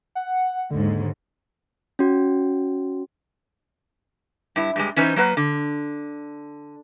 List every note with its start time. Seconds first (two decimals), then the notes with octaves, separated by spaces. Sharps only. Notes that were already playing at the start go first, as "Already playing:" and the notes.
0.15 F#5
0.71 D#2 G#2 D3
1.99 C#4 F#4
4.56 G2 E4
4.76 G2 G3 G#3
4.96 E3 C#4 D#4 B4 C5
5.16 F#3 A#3 B4 F#5
5.37 D3